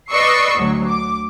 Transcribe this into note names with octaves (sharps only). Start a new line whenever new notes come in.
B4 D5 D#5 C#6 E6 C7
D2 F#3
D6